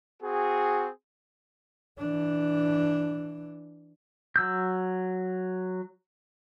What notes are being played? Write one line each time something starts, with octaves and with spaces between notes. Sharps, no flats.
C4 F#4 G#4
E3 D4
F#3 E6 G6